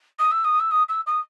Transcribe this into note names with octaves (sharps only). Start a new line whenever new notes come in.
D#6
E6
D#6
E6
D#6
E6
D#6